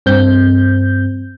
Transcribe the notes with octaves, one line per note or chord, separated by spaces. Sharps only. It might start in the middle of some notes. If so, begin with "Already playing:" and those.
G2 C4 G6